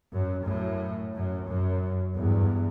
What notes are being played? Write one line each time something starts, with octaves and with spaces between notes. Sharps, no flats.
F#2
F#2 A2
F#2
F#2
E2 G2